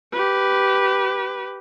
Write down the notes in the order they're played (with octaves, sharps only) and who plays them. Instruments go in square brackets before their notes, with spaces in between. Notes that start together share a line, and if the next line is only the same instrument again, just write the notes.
[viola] G4 B4